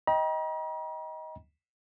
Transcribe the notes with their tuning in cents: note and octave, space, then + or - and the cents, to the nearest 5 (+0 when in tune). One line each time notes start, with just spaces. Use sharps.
D#5 +15 G5 +0 A#5 +40